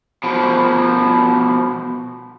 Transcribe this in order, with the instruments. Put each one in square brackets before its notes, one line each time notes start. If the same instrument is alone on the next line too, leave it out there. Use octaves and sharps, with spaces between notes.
[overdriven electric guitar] B2 F3